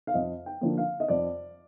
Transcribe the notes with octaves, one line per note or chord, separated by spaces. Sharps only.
F5
F2 D#5
G5
D3 F3 A#3
F5
D#5
F2 D5